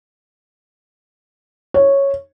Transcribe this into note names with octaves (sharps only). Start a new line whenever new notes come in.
C#5